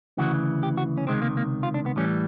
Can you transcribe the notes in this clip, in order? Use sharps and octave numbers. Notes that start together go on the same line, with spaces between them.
D2 C#3 E3 F#4
G4
F#4
C#4
C#2 C3 D#3 G#3 C4
A#3
A#3
F4
D4
B3
A2 E3 G3 C#4